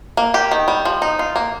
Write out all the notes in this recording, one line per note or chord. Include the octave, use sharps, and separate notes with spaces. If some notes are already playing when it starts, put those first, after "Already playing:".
A#3
G4
D#3
G3
F3
D#4
F4
A#3